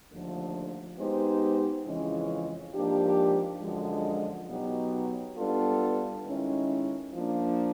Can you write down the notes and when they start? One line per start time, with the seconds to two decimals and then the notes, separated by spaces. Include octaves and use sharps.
0.11 D#2 D3 F3 A3
0.98 G#3 B3 D#4 G4 C5
1.86 F2 C#3 E3 G#3 C#4
2.74 G#2 F3 A#3 D4 G4
3.61 F#2 D3 F3 G#3
4.49 B2 F#3 B3 D#4 G4
5.37 G3 B3 D4 F4 A4
6.25 D#3 G#3 C#4 E4
7.13 F3 A#3 D4